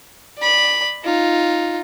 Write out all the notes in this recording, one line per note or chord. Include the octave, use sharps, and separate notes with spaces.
D5 B5
D#4 F4